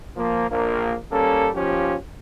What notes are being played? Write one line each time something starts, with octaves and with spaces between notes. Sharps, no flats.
F3 A#3
A#1 A#3
G3 A#3 C#4 A4
D#2 F3 C#4 F4 G4